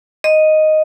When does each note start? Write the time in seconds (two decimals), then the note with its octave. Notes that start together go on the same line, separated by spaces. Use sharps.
0.24 D#5